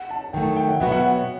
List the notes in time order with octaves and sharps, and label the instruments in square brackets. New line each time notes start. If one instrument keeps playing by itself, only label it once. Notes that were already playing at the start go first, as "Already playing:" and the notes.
Already playing: [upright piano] F#5
A5
[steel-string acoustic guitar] D#3 F#3 A3 [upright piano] G5
[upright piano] G5
F#5
[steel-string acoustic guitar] B2 F#3 B3 F#4 [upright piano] E5
[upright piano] F#5